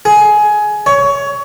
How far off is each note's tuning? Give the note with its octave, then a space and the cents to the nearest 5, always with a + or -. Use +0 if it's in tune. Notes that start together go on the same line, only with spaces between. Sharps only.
G#4 +15
C#5 +20